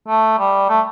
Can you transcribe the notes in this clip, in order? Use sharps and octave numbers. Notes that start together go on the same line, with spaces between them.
A3
G3
A3